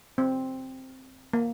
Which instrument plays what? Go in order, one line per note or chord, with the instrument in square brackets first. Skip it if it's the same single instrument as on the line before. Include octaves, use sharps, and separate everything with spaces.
[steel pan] C4
A#3